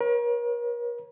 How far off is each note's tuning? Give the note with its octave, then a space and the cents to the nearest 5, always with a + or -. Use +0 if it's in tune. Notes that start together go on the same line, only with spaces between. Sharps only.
A#4 +40 C#5 -30